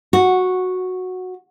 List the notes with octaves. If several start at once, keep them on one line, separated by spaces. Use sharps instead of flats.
F#4